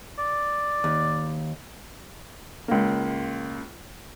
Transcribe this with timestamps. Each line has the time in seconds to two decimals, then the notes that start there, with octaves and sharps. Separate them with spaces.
0.18 D5
0.84 D#2
2.68 C#2 A#3